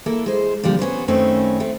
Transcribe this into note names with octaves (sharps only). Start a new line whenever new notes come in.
A#3 E4 A4
G#3 C5
A#2 D3 F3 G3
B3 C#4 B4 C5
F#2 D#3 A3 C4 C#4 E4
A3 C4